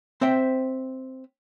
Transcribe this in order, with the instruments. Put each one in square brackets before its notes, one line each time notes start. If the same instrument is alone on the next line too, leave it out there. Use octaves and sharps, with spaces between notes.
[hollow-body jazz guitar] C4 C5 E5 G5